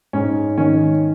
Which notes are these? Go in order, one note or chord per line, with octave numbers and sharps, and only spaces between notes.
G#2 C#4
D#3 C#4